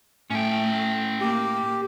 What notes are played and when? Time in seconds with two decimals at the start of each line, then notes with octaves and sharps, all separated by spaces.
0.30 A2 A3 C#4 G5
1.20 A#3 G4